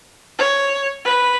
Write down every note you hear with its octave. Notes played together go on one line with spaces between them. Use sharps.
C#5
B4